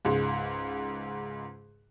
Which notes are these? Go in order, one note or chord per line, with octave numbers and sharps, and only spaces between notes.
C#2 G#2